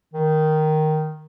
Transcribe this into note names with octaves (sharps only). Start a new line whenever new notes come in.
D#3